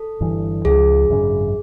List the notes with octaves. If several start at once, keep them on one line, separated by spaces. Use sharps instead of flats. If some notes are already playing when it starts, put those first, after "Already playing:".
Already playing: A4
G1 G2 E3
C#2 C#3 F3 G#4
G#1 F#2 C#3